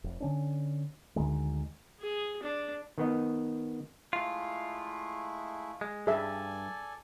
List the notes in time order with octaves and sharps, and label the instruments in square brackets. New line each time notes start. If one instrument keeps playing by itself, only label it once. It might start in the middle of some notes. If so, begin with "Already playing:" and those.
[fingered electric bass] F1
D3 C#4 D4
D2 D3 D#3 G#3
[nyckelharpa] G#4
D4
[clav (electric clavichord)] D#3 B3 D#5
[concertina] G#3 A3 E4 [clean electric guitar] F4
[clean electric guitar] G#3
[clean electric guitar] G2 [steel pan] G#4 E5 [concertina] A4 D5 G#5